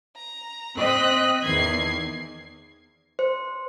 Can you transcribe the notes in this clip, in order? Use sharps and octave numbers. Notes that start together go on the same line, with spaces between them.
A#5
C4 D#5 F#6 B6
E2 D#3 G#6 C7
C5